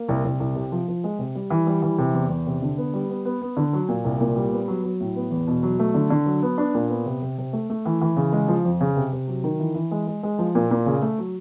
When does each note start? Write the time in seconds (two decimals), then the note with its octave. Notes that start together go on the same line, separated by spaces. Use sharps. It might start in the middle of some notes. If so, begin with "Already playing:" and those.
Already playing: A#3
0.09 C2
0.25 C2
0.40 C2
0.55 C3
0.72 F3
0.88 F3
1.04 G#3
1.19 C3
1.35 G3
1.50 E3
1.67 G3
1.82 E3
1.98 C3
2.14 E2
2.30 E2
2.47 C3
2.62 D3
2.78 B3
2.94 G3
3.10 B3
3.25 B3
3.42 B3
3.57 D3
3.73 F#3
3.88 A#2
4.04 C2
4.21 A#2
4.36 G3
4.52 B3
4.68 F#3
4.84 F#3
5.00 A2
5.16 B3
5.31 E2
5.47 B2
5.63 F#3
5.79 A3
5.94 D3
6.10 D3
6.26 F#3
6.42 B3
6.58 D4
6.74 A#2
6.89 B3
7.06 C3
7.22 C3
7.38 C3
7.53 A3
7.70 A3
7.85 E3
8.01 E3
8.16 C#3
8.33 G#3
8.48 F3
8.65 F2
8.81 C#3
8.96 C3
9.12 C3
9.28 F#3
9.44 D#3
9.59 E3
9.75 E3
9.91 G#3
10.07 G#3
10.23 G#3
10.39 F3
10.55 A#2
10.71 A#2
10.86 C#3
11.02 A3
11.18 F#3